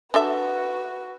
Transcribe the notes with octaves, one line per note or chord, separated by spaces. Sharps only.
D4 F#4 A4 B4 E5